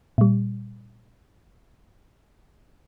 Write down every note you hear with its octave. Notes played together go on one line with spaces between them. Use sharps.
A#2 G3